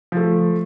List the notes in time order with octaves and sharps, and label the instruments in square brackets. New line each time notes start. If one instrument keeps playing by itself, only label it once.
[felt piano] F3 A3